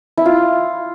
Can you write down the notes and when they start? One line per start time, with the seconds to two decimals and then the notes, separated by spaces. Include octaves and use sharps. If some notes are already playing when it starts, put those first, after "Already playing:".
0.18 E4
0.26 F4